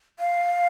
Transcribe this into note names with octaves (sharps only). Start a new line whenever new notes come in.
F5